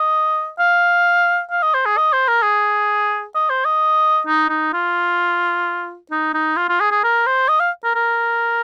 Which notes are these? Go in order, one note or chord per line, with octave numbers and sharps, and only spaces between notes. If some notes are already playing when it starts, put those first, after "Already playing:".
Already playing: D#5
F5
F5
D#5
C5
G#4
D#5
C5
A#4
G#4
D#5
C5
D#5
D#4
D#4
F4
D#4
D#4
F4
F4
G#4
G#4
A#4
C5
D#5
F5
A#4
A#4